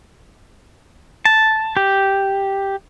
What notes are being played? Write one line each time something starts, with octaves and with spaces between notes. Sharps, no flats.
A5
G4